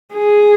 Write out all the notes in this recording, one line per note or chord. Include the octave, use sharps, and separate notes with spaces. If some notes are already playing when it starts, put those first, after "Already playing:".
G#4